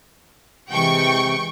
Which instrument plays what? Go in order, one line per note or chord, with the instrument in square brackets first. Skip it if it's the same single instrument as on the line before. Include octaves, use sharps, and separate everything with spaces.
[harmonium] C3 [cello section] E3 G#3 [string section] G5 C#6